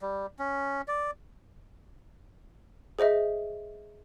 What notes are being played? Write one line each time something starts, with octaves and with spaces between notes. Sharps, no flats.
G3
C#4
D5
G#4 C5 D#5 E5